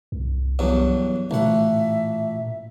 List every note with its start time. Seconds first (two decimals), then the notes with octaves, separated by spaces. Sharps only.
0.12 C2
0.59 E2 G2 F#3
1.31 A1 A#2 E5 F#5